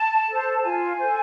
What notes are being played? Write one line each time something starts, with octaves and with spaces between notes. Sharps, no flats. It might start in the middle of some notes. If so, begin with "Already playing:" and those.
Already playing: A5
A4 C5
F4 G#5
A4 C5